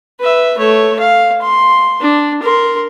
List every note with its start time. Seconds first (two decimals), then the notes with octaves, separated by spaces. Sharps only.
0.20 B4 E5
0.58 A3 C#5
1.00 F5
1.42 C6
2.01 D4
2.43 A#4 C6